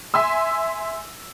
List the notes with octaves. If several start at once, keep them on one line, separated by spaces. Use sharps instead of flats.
E5 G#5 C6 E6